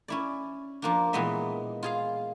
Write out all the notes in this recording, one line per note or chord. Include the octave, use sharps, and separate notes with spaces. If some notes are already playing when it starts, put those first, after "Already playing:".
C#4 E4 D5
F3 A#3 D4
A#2 E3 G#3 B3 D#5 E5
F4 G#4 F5